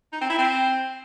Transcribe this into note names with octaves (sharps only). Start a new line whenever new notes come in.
D#4
C4
E4
C4